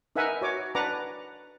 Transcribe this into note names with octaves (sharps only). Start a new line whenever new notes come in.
D#4 A#4 B4 E5 F#5 G#5
F#4 C#5 D6
D4 B4 F#5 A#5 D6